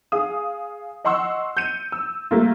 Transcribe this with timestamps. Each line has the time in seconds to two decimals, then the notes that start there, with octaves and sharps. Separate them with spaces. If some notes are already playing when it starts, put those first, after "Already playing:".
0.12 G#4 F5 D#6
1.05 D#5 F#5 C6 C#6 E6
1.57 G6 C#7 D#7
1.92 E6
2.31 G3 A3 A#3 F4